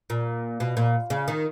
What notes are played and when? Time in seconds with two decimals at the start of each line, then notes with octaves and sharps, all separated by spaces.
0.10 A#2
0.60 B2
0.77 A#2
1.10 C#3
1.28 D#3